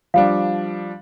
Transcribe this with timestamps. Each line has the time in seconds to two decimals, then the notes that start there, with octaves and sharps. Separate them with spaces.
0.14 F3 G3 D4 F5